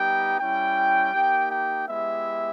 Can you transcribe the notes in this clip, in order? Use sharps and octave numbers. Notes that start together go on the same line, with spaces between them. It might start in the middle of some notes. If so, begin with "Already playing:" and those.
Already playing: G3 B3 D#4 G4 G5
G3 C#4 E4 G5
A#3 D#4 G4
G5
G#3 B3 E4 G4 E5